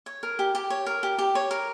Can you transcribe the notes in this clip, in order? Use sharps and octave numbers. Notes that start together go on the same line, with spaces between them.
C#5
A#4
G4
G4
C#5
A#4
G4
G4
C#5
A#4